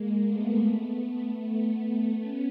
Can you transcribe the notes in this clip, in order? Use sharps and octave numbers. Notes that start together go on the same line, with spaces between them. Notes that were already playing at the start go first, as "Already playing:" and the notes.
Already playing: G#3 A#3
A3 B3
A3 B3
A3 B3
B3 C#4